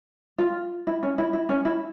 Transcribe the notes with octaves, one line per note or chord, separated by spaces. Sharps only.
F4
E4
C#4
E4
E4
C#4
E4